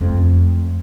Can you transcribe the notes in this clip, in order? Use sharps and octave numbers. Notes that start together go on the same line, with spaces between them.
F2 A3